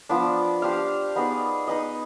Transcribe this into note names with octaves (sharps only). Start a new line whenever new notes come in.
F3 B3 D4
D4 G4 C5 F5
B3 D#4 G#4 D5
D#4 G#4 B4 D#5